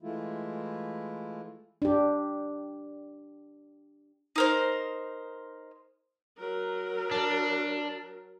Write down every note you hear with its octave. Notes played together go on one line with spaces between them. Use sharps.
E3 G#3 A3 E4 F4
D4 G4
D#4 A#4 C5
F#3 A#4
D4